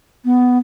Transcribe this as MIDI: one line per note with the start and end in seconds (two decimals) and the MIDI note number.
0.25 0.58 59